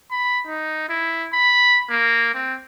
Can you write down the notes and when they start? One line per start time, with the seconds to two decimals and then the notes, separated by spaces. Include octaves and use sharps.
0.11 B5
0.46 D#4
0.89 E4
1.33 B5
1.90 A#3
2.35 C4